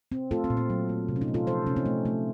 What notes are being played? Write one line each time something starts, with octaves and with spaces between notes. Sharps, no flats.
C4
A3 F4 A4
C4
A#2
C4
F#3
A3
C3
C#4
C4 D#4
A3
F4 A4
F3 A4 C5
C3 C#4
C4 D#4
A3
A3